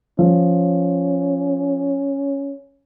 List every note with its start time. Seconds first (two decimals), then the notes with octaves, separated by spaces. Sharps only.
0.19 F3 C#4